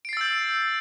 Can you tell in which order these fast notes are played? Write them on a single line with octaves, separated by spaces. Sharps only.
D7 C7 A6 E6 G6